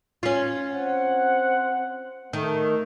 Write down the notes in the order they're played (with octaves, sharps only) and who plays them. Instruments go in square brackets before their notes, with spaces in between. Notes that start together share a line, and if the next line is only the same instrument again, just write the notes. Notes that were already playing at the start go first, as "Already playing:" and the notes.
[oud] C#4 F4
[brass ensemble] C4 C5 F#5
[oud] D#3 [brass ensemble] A3